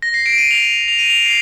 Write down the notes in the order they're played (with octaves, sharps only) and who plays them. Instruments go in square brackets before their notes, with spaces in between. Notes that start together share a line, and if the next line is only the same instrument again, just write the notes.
[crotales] A#6
C7
D7
D#7
F7
F7
D#7
F7
C7